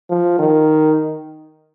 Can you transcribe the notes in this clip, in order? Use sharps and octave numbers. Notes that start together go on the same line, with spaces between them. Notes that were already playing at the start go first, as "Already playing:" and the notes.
F3
D#3